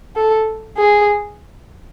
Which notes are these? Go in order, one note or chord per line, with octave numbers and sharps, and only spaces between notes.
A4
G#4